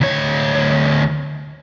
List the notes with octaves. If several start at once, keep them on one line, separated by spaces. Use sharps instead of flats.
D2 C#5